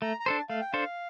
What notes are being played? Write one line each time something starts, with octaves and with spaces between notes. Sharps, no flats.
A3 A#5
A#5
D4 A4 C5 A5
A3 F5
G5
D4 A4 C5 F5